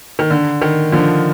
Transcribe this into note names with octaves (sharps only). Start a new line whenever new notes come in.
D#3
D3
D#3
D3 F3